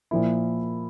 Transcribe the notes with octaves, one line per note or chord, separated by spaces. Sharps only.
A#2 F3 A#3 E4